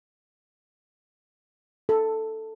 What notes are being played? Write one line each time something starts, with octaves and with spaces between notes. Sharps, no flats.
A4